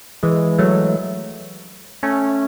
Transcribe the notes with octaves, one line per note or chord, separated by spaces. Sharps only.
E3 G#3
F#3 A3
A3 C#4